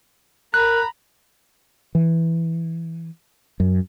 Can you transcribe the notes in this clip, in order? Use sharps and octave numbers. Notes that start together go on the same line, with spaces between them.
A#4 A#5 B5 F#6
E3
F#2